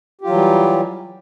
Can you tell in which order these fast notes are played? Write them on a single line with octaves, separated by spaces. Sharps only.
G4 F4 F#3 E3 G3